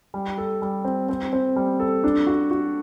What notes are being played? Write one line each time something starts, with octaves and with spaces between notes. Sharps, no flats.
G3
A4
G3
C4
C4
C4
G3
A4
D4
F#4
F#4